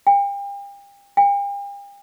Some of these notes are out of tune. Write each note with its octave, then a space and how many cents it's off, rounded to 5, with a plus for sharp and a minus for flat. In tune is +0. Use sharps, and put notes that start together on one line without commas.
G5 +40
G5 +45